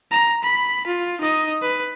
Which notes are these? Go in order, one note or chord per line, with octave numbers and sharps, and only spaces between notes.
A#5
B5
F4
D#4 D#5
B4